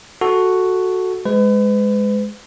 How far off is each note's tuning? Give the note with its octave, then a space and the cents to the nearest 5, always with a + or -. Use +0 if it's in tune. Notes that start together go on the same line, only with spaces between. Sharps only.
F#4 +0 A4 +0
G#3 +0 B4 +35